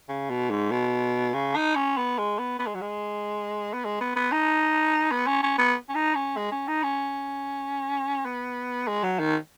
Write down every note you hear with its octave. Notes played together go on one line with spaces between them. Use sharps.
C#3
B2
G#2
B2
C#3
D#4
C#4
B3
G#3
B3
B3
G#3
F#3
G#3
B3
G#3
B3
B3
D#4
B3
C#4
C#4
B3
C#4
D#4
C#4
G#3
C#4
D#4
C#4
B3
G#3
F#3
D#3